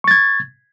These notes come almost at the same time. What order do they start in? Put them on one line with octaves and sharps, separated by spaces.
C#6 A6 G#6